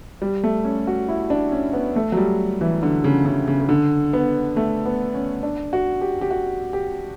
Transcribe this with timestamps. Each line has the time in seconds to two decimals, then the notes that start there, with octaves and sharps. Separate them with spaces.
0.22 G3
0.43 A3
0.65 C#4
0.87 F#4
1.09 E4
1.30 D4
1.52 C#4
1.73 B3
1.96 A3
2.12 F#3
2.17 G3
2.61 E3
2.83 D3
3.04 C#3
3.26 C#3
3.47 C#3
3.61 C#3
3.69 D3
4.13 B3
4.56 A3
4.85 B3
5.14 C#4
5.43 D4
5.73 F#4
6.01 G4
6.21 G4
6.31 F#4
6.73 G4